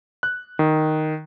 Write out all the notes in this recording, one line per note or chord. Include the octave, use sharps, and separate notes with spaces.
F#6
D#3